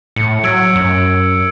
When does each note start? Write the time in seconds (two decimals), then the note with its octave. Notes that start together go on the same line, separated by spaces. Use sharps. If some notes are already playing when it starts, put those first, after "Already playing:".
0.16 A2 C#7
0.43 F#3 E6 G#6 D7
0.76 F#2